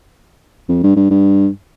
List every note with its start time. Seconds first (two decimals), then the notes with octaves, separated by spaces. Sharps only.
0.69 F2
0.83 G2
0.96 G2
1.11 G2